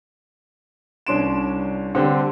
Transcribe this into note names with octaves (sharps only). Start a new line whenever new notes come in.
C2 C#4 D4 C6 D7 E7
D3 G3 C4 G4 C5